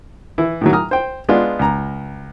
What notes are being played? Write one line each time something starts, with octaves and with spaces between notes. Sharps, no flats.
E3 E4
A2 D#3 F#3
A#5 D#6 F6
C5 G5
G#3 B3 D4 F4
C#2 A#5